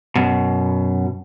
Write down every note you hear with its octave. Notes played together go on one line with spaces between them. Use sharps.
F#2 B2